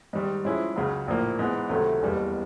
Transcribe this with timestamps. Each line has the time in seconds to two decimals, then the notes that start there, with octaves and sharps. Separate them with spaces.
0.13 G#2 D#3 G3
0.45 G#2 F3 G#3 C#4 E4
0.76 C#2 C#3 F#3
1.08 A#1 A2 F3 A#3
1.39 G#2 E3 G#3 B3
1.69 C#2 C3 D#3 F#3 A3
2.02 F#1 E2 B2 G3